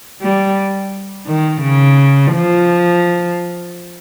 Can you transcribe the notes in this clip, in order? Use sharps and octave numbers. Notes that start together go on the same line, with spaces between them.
G3
D#3
C#3
F3